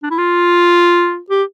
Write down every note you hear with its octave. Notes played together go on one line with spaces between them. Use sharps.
D4
E4
F4
G4